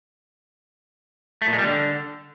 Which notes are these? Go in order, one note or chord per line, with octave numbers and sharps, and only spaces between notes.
A3
A#2
G#3
G3
D3